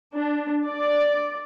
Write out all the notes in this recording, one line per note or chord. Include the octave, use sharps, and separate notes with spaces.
D4
D5